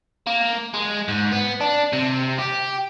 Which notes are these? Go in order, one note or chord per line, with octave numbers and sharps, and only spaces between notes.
A#3
G#3
G#2
B3
D4
C3
G4